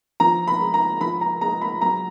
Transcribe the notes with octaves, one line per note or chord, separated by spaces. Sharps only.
F3 A#5
B5
G#3
A#5
F3 B5
A#5
G#3 A#5
B5
F#3 A#5